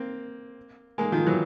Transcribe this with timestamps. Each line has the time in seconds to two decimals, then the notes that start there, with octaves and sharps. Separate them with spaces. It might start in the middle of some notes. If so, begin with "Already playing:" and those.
Already playing: A#3 C4
0.98 G#3 A#3
1.12 D#3 F3
1.27 E3 F#3